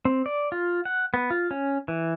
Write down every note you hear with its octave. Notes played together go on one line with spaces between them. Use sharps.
C4
D5
F4
F#5
B3
F4
C#4
E3